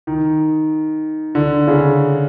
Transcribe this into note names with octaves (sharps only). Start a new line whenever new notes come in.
D#3
D3
C#3